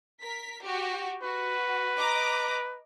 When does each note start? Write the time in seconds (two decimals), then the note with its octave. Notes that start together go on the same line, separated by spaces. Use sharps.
0.22 A#4 B6
0.63 F#4 G4
1.23 F#4 B4
1.97 D#5 A#5 D6